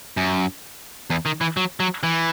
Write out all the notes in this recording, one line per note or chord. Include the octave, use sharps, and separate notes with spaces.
F#2
E2
D#3
E3
F#3
F#3
E3